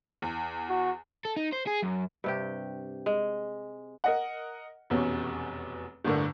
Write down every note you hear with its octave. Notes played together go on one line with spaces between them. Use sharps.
E2
F#4
A4
D#4
C5
G#4
F#2
G2 C3 G4
G#3
A#4 D#5 F#5
F1 E2 B2 C#4
G1 A2 D3 A#4